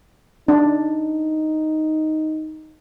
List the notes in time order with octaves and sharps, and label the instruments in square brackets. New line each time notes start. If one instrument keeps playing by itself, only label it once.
[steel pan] D4 [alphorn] D#4